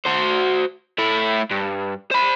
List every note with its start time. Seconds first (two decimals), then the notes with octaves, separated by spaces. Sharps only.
0.06 F#4 C5
0.98 A3 E4
1.51 G2
2.12 C5 B5